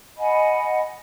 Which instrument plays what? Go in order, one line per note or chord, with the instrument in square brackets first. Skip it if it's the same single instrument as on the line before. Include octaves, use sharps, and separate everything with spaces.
[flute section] D#5 F#5 G#5 B5